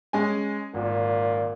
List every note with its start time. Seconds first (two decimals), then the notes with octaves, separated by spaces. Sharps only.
0.13 G#3 C#4 G#5
0.74 G#1 A#2